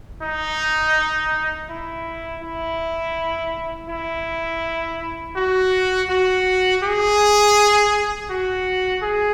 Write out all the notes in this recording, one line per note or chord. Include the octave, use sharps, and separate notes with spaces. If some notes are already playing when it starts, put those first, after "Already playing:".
D#4
E4
E4
E4
F#4
F#4
G#4
F#4
G#4